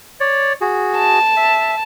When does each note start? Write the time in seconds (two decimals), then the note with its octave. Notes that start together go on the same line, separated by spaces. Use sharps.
0.20 C#5 D5
0.61 F#4 G#4
0.98 A5
1.36 E5